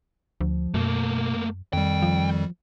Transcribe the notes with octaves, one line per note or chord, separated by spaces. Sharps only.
D2 F3
F#2 B2 A3 A#3
F2 D#3 G3 G5
F3